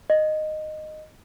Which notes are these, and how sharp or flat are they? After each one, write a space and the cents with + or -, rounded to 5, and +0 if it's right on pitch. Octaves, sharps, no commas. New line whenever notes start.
D#5 -10